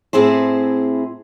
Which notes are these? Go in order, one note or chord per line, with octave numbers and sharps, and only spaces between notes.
A2 C4 E4 G#4 C5